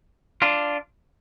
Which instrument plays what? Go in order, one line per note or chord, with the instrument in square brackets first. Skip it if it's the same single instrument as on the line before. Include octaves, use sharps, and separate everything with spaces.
[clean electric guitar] D4 F4